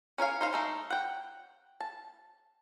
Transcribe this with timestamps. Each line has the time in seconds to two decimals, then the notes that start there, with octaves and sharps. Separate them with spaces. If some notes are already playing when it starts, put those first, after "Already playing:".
0.18 C#4 A#4 C#5 F5
0.41 D#4 C5 F5
0.53 G#3 A3 D#4
0.90 F#5 G5
1.80 A5